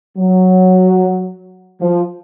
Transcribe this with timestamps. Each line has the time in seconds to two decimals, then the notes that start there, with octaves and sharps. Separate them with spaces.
0.18 F#3
1.81 F3